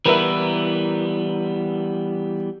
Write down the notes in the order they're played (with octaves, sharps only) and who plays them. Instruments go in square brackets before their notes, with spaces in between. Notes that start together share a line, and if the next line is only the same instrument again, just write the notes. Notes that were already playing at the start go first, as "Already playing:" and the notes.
[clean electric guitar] E3 G3 B3 [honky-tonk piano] E4 A#4 B4